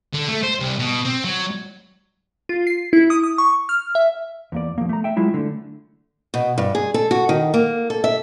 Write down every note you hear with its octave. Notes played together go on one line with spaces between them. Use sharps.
D3
A3
C5
C2
B2
C4
F#3
F4
C7
E4
D#6
D#6
C#6
F6
E5
E2 A#3 D5
F3 F#3 A#3
A3 A#5
E5 G5
F#3 G#3 E4 F4
D3 A3
B2
G2
G#4
A4
F#4
D#3
A#3
A4
E5